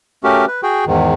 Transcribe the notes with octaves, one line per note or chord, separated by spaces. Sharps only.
A3 C#4 F#4 G4 A#4
B4
F#4 G#4 G5
E2 G#2 D#3